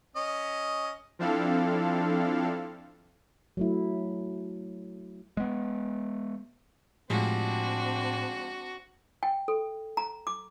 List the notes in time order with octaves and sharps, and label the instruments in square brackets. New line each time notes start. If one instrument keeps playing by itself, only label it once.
[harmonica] C#4 D#5
[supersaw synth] F3 C4 D4 E4 A4 F5
[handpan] F#3 A3 E4
[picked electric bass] G#3 B3
[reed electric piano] A2 [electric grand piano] F3 G3 G#3 [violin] C4 D4 [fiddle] F#4
[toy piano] G5
A4
A#5
D6